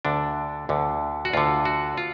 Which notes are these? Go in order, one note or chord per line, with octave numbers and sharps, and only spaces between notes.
D2 D3 D4
D2 D3
F#4
D2 D3 F4
F#4
F4